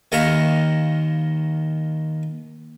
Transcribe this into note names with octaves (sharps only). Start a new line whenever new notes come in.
D#2 D#3 E4 F5 A#5 C#6